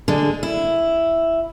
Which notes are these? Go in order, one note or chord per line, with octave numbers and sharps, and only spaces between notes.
D3 G#3
E4